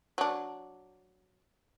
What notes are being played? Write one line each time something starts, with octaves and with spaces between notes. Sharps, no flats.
F#3 D4